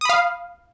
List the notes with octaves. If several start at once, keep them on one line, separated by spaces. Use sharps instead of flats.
F5 B5 D#6